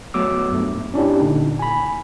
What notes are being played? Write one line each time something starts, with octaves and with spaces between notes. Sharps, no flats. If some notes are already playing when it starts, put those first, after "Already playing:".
F#3 A3 B3 D6 E6
G2 A3
C#4 D4 E4 G4
A#2 D3 D#4
G#5 B5